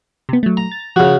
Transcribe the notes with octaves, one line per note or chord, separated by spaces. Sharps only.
C3 B3
F#3 A3
A#5
A6
C#3 F3 F#4 F6